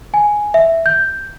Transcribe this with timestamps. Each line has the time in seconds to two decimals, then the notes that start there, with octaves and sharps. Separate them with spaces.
0.14 G#5
0.54 E5
0.86 G6